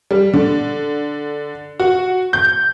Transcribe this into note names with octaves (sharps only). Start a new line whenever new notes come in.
G3
D3
F#4
G6